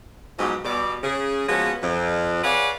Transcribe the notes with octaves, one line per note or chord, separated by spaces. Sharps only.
G#2 B2 F3 F#3 G4 D#5
B2 G3 D5
C#3 G#4
F3 G#3 A#3 B3 C#4 F#4
F2
G#4 B4 C#5 D5 F5 F#5